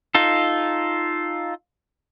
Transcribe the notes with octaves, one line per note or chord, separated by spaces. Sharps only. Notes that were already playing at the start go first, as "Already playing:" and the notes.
D#4 F4 A4